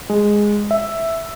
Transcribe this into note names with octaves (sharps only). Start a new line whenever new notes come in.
G#3
E5